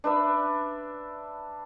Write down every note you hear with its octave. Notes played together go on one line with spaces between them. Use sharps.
D4 B4 E5